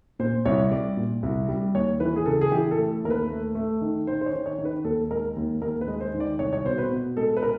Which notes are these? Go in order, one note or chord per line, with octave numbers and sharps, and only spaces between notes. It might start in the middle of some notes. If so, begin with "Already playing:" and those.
A#2 C5
C2 C#5
G3 D5
A#2
C2
G3
D#2 C#5
E3 B4
G#4
C#3 A4
G#4
E3 G4
A4
A3
D#2 A#4
B4
A3
A3
D#3
D#3 C5
C5
C#5
D#3
C#5
D#3
B4
D#2 A4
G#3 A#4
D#2
D#2 A#4
B4
G#3
C5
D#3
D5
C2 C#5
C#5
B2 C5
B4
B2
G#3 A4
B4
A#4